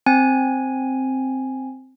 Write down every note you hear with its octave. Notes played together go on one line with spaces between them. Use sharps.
C4 G#5